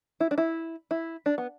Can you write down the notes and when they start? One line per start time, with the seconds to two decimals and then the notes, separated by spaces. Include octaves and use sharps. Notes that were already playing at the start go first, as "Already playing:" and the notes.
0.20 E4
0.31 D4
0.38 E4
0.91 E4
1.26 D4
1.38 B3